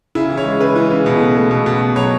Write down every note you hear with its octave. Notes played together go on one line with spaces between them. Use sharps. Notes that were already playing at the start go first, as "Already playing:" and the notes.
C#3 E4
E3
C#5
G#3
C#3 B4
E3
C#3
B2
A3
A3
B2
B2
B2
F#3 C#5